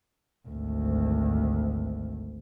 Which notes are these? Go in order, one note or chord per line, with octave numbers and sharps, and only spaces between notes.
G#1 D2